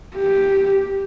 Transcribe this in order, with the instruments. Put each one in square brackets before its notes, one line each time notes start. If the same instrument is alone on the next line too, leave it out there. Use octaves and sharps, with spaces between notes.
[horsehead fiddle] G4